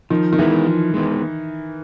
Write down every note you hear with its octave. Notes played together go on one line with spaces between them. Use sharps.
D#3 F3
D#3
E3 G#3 B3 E4
F3
G#3 B3 E4